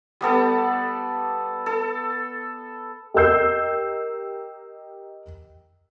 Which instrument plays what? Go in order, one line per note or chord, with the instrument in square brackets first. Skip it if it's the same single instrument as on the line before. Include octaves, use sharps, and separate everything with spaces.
[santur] G3 B3 A4 D5
A4
[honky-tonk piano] G4 A#4 D#5 E6 G6 C7